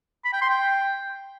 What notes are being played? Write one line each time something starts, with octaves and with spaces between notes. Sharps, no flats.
B5
G5
C6
G5